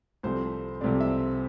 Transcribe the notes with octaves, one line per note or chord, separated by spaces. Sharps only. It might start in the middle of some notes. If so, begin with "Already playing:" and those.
C2 C3 F3 A3 C4 C5
C2 C3 F3 A3 C4 D5
E5